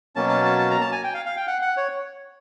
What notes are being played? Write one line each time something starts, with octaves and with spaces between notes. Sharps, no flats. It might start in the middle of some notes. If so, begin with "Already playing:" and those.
B2 F#3 A#3 C#4 A5
A5
A5
A5
A#5
A5
G#5
G5
F5
F5
G5
F#5
F#5
C#5